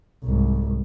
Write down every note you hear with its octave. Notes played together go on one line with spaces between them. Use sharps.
C2 G#2